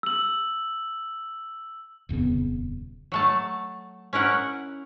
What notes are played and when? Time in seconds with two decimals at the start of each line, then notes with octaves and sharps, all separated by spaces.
0.03 E6 F#7
2.09 D#1 F2 C#3 B3
3.12 F#3 A3 A5
4.13 C#4 E4 A#4 F#5